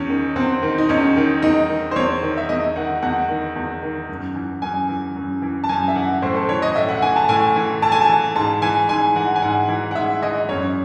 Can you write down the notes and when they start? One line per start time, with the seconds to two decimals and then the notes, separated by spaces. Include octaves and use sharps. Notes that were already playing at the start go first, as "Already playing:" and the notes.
Already playing: E2 C#4
0.09 D#3
0.36 E2 C4
0.62 D#3
0.78 D#4
0.89 E2 C#4
1.16 D#3
1.42 E2 D#4
1.69 D#3
1.91 C5
1.96 E2 C#5
2.23 D#3
2.37 E5
2.49 E2 D#5
2.76 D#3 F#5
3.02 E2 F#5
3.29 D#3
3.56 E2
3.83 D#3
4.09 F#2
4.36 E3
4.62 F#2 G#5
4.89 E3
5.16 F#2
5.42 E3
5.64 A5
5.69 F#2 G#5
5.88 E5
5.96 E3 F#5
6.22 A2 C5
6.36 A4
6.49 E3 C#5
6.62 D#5
6.75 A2 E5
6.89 F#5
7.02 E3 G#5
7.16 A5
7.29 A2 G#5
7.56 E3
7.82 A2 A5
7.92 G#5
8.01 A5
8.09 E3
8.35 G#2 A5
8.62 E3 G#5
8.89 G#2 G#5
9.16 E3 F#5
9.36 G#5
9.42 G#2 F#5
9.68 E3
9.91 F#5
9.95 G#2 E5
10.22 E3 D#5
10.49 F#2 C#5